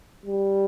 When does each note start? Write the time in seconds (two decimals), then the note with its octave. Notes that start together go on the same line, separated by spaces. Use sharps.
0.26 G3